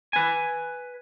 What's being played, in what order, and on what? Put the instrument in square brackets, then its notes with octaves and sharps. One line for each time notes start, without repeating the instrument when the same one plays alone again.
[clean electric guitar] B4 G#5